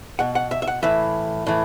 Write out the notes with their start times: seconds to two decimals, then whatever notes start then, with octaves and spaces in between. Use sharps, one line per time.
0.19 B2 F#5
0.35 F#5
0.51 E5
0.62 E5
0.68 F#5
0.83 A2 E3 E5
1.47 A2 E3